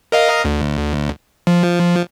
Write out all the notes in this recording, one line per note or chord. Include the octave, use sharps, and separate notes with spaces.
A#4 D#5 F5
D2
F3